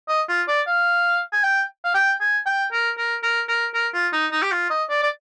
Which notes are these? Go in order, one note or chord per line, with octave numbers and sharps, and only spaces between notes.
D#5
F4
D5
F5
G#5
G5
F5
G5
G#5
G5
A#4
A#4
A#4
A#4
A#4
F4
D#4
D#4
G4
F4
D#5
D5
D5